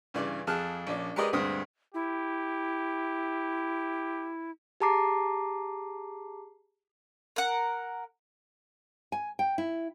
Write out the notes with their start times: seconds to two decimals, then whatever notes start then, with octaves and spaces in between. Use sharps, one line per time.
0.14 G2 C#3 E3 D5
0.47 F2 G#4 A5 F6 F#6
0.87 A#1 C#4 D4
1.16 G#3 G4 A#4 B4 D5 D#5
1.33 D2 G2 G#3 C4 D#6
1.94 E4 G4
4.80 G4 G#4 A5 A#5 D6 C7
7.36 A#4 F#5
9.12 G#5
9.39 G5
9.58 E4